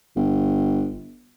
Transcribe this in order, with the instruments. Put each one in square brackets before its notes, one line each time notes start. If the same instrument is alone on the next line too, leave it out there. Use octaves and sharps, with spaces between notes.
[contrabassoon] G1